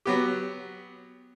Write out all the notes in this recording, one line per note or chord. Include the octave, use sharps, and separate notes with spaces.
F#3 B3 G4